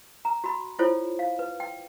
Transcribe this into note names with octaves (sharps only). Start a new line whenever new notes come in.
A#5
F#4 B5
E4 F4 A4 C5 C#5
F5
B4
G5